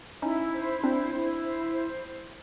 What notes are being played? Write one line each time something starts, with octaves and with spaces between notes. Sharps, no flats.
C#4 D#4 E4
C5
C4 D4 E4
E4
C5
C5